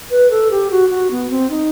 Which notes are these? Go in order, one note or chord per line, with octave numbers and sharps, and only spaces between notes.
B4
A4
G4
F#4
F#4
B3
C4
D#4